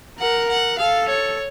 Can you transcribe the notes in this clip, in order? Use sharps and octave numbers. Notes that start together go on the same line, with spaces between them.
A#4 F#5
F#5
A4 F5
C#5